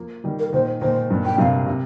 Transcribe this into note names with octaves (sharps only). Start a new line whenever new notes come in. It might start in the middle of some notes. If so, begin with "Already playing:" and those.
Already playing: F3 A#3
D#3 G3
A#4
A#2 D#3 C5
A#2 D#3 C5
G2
A#2 G5
G2 C3 F5
C3